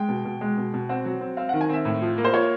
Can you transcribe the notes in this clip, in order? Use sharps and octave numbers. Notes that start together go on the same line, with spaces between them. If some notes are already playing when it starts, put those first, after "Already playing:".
Already playing: G#3 G5
B2
B2
G#3
B2
B2
C4 F#5
F#3
C4
C4 F5
D#3 F#5
G#5
C4 E5
A2
F3
A#3
C5
F3 C#5